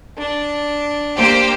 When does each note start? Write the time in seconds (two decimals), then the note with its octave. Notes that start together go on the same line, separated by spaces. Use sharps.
0.18 D4
1.16 A#3 G4 C5